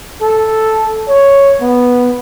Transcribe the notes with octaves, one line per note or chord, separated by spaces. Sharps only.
A4
C#5
B3